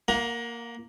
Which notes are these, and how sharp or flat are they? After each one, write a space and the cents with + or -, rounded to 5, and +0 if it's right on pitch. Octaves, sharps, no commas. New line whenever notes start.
A#3 +0 F#5 -30 A#5 +25